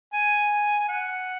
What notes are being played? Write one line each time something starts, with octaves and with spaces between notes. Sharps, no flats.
G#5
F#5